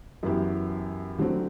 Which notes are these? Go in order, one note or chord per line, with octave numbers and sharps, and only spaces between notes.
F#2 E3 B3 E4 G4
D3 F#3 A3 C4